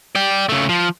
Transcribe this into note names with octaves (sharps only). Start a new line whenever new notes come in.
D5 G5
C#3 A3
F3